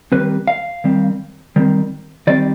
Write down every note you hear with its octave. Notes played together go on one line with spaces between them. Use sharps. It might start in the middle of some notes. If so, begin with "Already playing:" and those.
D#3 G3 C4 B4
F5
D#3 G3 C4
D#3 G3 C4
D#3 G3 C4 D5